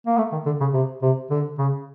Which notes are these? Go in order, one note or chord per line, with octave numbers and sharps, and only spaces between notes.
A#3
A3
D#3
D3
C#3
C3
C3
D3
C#3